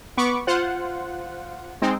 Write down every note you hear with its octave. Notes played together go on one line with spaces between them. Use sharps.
B3 B5 C#6 D6
F4 C5 F#5
G#3 C4 D#4